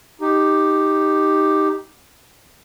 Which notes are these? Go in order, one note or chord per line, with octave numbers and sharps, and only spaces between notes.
D#4 G4